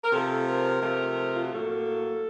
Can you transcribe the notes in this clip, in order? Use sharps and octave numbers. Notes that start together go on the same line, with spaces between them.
A#4
C3 F3 A3 A4
A#4
C3 F3 A3
F4
F#4
A2 F#3 A#3 A4